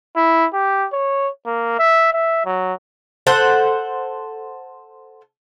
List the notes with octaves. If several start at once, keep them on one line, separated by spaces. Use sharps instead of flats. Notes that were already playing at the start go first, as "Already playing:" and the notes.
E4
G4
C#5
A#3
E5
E5
F#3
A4 C5 F#5